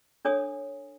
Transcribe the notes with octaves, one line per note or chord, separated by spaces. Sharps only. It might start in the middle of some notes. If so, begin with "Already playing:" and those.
D4 A4 C#5 G#5 D#6